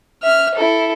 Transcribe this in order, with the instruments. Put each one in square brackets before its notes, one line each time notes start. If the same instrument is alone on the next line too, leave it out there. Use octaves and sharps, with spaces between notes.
[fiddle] E5 F6
E4 A4